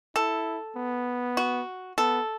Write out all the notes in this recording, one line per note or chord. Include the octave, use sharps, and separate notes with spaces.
E4 A4
B3
F#4
B3 A4